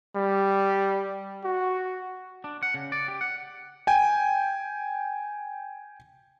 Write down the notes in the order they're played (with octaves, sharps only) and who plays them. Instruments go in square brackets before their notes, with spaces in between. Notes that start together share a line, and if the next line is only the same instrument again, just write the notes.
[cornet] G3
F#4
[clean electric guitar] D4
F#5
C#3
D5
G4
F#5
[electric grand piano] G5 G#5